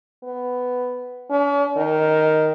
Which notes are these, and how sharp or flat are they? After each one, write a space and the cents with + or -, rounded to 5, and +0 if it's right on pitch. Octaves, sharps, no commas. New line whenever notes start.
B3 +10
C#4 +45
D#3 +0